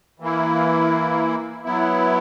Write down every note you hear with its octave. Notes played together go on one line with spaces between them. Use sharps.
E3 A#3 E4
F#3 B3 E4